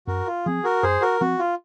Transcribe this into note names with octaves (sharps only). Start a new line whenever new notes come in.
F#2 F#4 A#4
F4
F3 C4 G#4
F#4 A#4
F#2 G#4 C5
F#4 A#4
F3 C4 F#4
F4